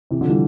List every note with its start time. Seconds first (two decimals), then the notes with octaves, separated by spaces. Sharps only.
0.11 C3 E3
0.21 D3 F3
0.29 E3 G3